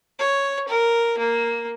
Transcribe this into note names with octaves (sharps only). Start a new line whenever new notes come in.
C#5
A#4
A#3